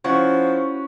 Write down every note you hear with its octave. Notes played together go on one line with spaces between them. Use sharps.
F3 C#4 E4 F#4